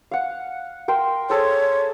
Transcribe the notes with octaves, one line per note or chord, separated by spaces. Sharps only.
F5 F#5
A#4 G5 C6
G#4 A4 C5 C#5